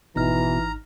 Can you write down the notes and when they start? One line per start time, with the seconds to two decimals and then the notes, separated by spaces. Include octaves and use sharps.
0.16 G#1 B2 E3 D#4 A#5 F6